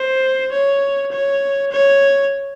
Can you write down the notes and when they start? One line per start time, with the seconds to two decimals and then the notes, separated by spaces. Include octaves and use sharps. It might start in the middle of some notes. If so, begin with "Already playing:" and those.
Already playing: C5
0.52 C#5
1.12 C#5
1.72 C#5